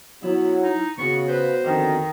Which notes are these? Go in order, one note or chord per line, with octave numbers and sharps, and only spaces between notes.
F#3 B3 E4
D#4
C#3 B3 C#4 F#4 C#6
B4 C5
F2 D3 D#3